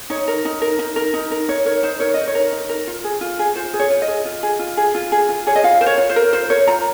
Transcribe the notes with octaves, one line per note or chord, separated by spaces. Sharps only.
D#4 C#5
A#4
D#4
A#4
D#4
A#4
D#4
A#4
D#4 C#5
A#4 C#5
D#4 C5
A#4 C#5
D#4 D#5
C#5
A#4
D#4
A#4
F4
G#4
F4
G#4
F4 C5
G#4
C#5
F4
D#5
G#4
F4
G#4
F4
G#4
F4
G#4
F4
G#4 C#5
D#5
F4 F5
A#4 C5
C#5
F4
C5
A#4
F4 C5
A#4 C#5
F4 A#5